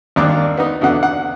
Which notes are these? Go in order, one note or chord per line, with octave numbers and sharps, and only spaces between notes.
G#1 D#2 A#3 D4 D6 F#6
B3 D#4
E2 B2 D3 F#5
F#5